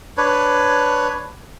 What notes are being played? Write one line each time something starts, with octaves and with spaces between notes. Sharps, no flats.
D4 B4 C#5